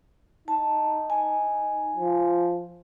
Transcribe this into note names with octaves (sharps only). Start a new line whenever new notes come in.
D#4 A5
G#5
F3